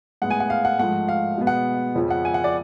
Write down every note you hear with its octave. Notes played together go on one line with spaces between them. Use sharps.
A2 G#3 B3 F#5
G#5
F#5
F5
F#5
G#2 F3 A3 F#5
F5
B2 G#3 B3
F#5
F2 C#3 F3
F#5
G#5
F#5
D5